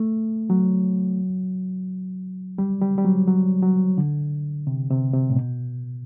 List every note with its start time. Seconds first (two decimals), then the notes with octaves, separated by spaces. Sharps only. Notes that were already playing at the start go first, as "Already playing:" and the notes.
Already playing: A3
0.50 F#3
2.58 G3
2.82 G3
2.98 G3
3.05 F#3
3.27 F#3
3.62 F#3
3.98 D3
4.67 C3
4.91 C3
5.14 C3
5.30 A2
5.36 B2